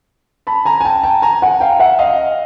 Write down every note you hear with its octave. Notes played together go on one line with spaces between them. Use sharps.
A5 B5
G#5 A#5
G#5
G5 A5
G5 A5
G#5 A#5
F#5 G#5
F5 G5
E5 F#5
D#5 F5